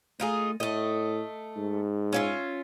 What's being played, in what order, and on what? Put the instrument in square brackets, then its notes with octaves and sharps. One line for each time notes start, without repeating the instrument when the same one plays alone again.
[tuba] A3 [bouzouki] D#4 F4 G#4
[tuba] A2 [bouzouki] A3 D#5
[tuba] G#2
[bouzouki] C#4 F4 E5